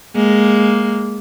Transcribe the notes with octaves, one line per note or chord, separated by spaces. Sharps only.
G#3 A#3